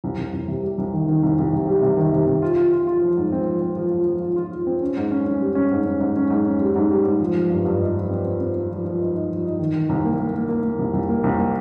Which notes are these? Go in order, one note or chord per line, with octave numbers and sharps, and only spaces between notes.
C2
C2
C2
C3
G3
C2
D#3
D#3
C2
C2
C3
G3
C3
D#3
C3
C3
F4
F4
F4
F4
F3
G#2
C4
F3
C4
F3
F4
F3
F4
F4
F4
C4
C#4
G#2
C#4
C#4
G3
C#4
G#2
C#4
G#2
C#4
G#2
C#4
G3
G#2
G3
G#2
F3
F3
G2
G2
D#4
F3
C4
C4
C4
C4
F3
F3
D#4
D#4
F3
D#4
D#3
D#3
C2
A#3
A#3
A#3
A#3
A#3
C2
C2
A#3
C2
A#3